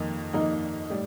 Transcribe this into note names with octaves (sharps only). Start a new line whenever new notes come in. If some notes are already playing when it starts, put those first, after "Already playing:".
Already playing: F2 D#3 A#3 D#4
F2 D#3 A#3 D#4
A2 G3